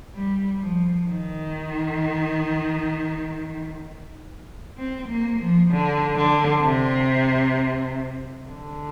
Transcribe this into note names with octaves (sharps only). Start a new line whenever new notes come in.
G3
F3
D#3
C4
A#3
F3
D3
D3
C3
D3